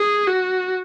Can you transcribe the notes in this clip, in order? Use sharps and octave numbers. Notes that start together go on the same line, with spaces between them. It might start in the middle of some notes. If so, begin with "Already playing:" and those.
Already playing: G#4
F#4